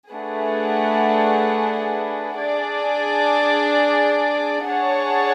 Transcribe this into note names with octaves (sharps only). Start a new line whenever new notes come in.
A3 D4 G#4 B4 F#5
D4 G#4 D5
D4 G#4 C#5 F#5 A5